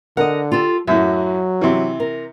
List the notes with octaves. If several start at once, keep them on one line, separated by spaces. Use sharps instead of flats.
D3 A#4 D#5 F#5
F4 G4 A4
F#2 A2 F#3 E5
C3 E3
A#4